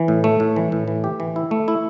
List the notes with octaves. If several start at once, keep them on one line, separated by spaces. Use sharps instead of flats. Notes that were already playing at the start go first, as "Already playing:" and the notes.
Already playing: E3
A2
A3
A2
E3
A2
E3
G4
E3
E4
A3
E4